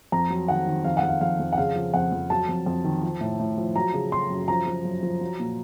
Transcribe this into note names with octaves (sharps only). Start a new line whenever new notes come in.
F2 A#5
F#3
D#3 F#5
D#3
F2 F5
F#5
F2
F5
F2 F5
F2
F#5
C#3 F5
F3
F2 F#5
F2
F#3 A5
F2
F2
D#3
F3
A2
A2
F3
F#3 A#5
C#3
F#3 C6
F#2
F3 A#5
F3
F#2
F3
F#3
A#2